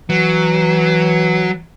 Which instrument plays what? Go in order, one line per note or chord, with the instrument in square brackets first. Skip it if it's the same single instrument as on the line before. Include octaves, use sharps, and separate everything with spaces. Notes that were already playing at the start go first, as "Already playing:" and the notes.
[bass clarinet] E3 [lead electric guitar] F#3